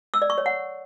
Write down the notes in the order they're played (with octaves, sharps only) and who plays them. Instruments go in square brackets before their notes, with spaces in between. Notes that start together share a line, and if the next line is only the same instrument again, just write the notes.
[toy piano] E6
D5
C#6
C#5
F#5